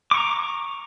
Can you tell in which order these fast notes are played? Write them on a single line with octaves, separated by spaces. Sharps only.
D6 C#6 A#5